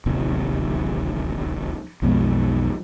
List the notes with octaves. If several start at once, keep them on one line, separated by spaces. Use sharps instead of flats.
D1 A1 D#2 C3
B1 F2 B2 G#3